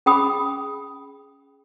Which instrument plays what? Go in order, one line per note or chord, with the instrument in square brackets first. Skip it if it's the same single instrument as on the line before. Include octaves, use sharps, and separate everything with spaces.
[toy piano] C#4 G#4 G5 B5 D#6